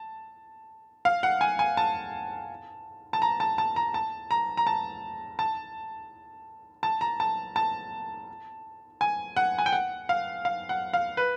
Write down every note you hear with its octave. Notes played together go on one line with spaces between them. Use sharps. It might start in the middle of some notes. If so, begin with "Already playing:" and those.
Already playing: A5
F5
F#5
G#5
G#5
A5
A5
A#5
A5
A5
A#5
A5
A#5
A#5
A5
A5
A5
A#5
A5
A5
G#5
F#5
G#5
G5
F#5
F5
F5
F#5
F5
B4